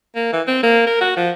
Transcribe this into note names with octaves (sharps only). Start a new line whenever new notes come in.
A#3
E3
C4
A#3
A#4
F#4
F3